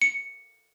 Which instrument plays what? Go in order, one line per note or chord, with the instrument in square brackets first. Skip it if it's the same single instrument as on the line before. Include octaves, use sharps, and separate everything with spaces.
[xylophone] C#7